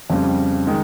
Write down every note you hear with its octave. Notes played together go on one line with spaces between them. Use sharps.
F2 C#3 G3
D#3 G#3